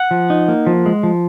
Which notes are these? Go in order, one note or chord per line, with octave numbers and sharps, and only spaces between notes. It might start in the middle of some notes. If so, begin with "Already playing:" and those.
Already playing: F#5
F3
D#4
A#3
F3
G#3
F3